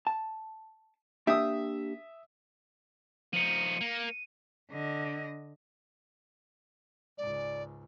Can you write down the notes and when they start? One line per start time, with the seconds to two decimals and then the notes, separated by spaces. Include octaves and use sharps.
0.07 A5
1.27 A#3 D4 G4 E5 D#6
3.33 F3 D#4 C#7 D#7
3.81 A#3
4.72 D3 D#5
7.18 C#2 G#2 D5